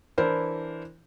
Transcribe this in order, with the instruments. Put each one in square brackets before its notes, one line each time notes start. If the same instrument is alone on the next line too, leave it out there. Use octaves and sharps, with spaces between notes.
[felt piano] E3 D4 E4 A#4 C5